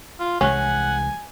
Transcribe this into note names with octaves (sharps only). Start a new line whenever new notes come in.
F4
C2 E3 G#3 C#4 F#5 G#5